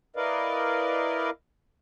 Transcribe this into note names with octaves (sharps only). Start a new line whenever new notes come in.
E4 A#4 B4 D5 D#5 F5